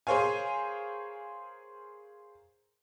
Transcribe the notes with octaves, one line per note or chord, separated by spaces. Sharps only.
G#4 A#4 C5 C#5 F5 G#5